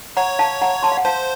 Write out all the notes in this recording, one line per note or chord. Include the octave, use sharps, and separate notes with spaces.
C#5 F#5 A#5
F5 A5
F#5 A#5
A5 C6
F5
F#5
C5 F5 A5